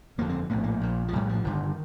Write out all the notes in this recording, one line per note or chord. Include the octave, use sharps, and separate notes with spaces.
G1 F2 D3 A#3
C4
A#1 A2 A#3 C4
A#3
A#1 A#2
F3
A#1 A2 G3
F3
G1 G2 D3 D#3